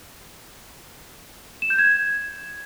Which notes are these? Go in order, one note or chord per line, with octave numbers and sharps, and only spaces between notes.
E7
G6
G#6